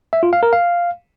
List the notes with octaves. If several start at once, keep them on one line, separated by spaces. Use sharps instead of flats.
E5
F4
F5
A#4
F5